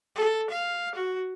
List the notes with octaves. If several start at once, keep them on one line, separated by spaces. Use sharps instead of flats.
A4
F5
F#4